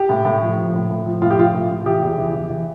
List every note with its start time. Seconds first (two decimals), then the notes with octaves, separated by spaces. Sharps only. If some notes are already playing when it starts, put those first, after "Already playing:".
Already playing: G4
0.09 A2
0.25 A2
0.42 F3
0.57 F3
0.74 A2
0.90 A2
1.06 F3
1.22 A2 F4
1.31 G4
1.38 F3 F4
1.54 A2
1.70 A2
1.86 E3 G4
2.02 E2
2.18 E3
2.34 E3
2.50 E3